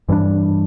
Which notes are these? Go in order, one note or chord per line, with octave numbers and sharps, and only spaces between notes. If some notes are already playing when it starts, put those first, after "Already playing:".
G2 E3 G3 D4